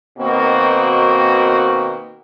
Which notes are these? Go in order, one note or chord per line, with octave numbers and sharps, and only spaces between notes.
B2 D#3 A#3 C4 F#4